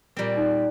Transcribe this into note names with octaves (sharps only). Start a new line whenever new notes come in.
A#2 G3 C4
D#4